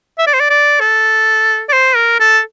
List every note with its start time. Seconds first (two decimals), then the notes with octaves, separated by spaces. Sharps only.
0.19 E5
0.27 D5
0.34 C5
0.40 D5
0.50 D5
0.80 A4
1.69 D5
1.73 C5
1.96 A#4
2.20 A4